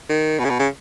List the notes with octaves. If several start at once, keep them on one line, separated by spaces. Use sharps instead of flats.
D#3
B2
C#3
B2
C#3